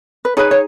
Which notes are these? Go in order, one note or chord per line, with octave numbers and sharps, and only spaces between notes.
B4
D#4 G#4 B4 C#5
C#5